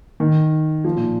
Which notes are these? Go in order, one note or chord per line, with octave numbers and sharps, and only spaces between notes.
D#3
F3
A#2